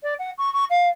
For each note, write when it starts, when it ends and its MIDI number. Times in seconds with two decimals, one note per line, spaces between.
0.03 0.14 74
0.19 0.31 78
0.38 0.52 85
0.53 0.65 85
0.70 0.89 77